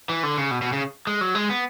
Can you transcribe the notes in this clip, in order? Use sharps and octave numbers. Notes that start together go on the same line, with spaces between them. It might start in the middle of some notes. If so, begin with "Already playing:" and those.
E3
D3
C#3
B2
B2
C#3
G#3
F#3
G#3
B3